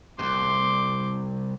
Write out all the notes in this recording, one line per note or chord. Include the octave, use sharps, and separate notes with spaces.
C2 G2 C6 D6